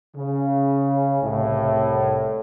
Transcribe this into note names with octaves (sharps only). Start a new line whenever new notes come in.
C#3
C2 A2